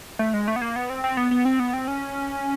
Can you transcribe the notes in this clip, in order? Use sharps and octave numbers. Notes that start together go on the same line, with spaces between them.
A3
G#3
A3
B3
A#3
B3
C4
C4
B3
B3
C4
B3
C4
C#4